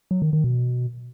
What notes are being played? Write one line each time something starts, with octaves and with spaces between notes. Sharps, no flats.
F#3
D#3
D#3
B2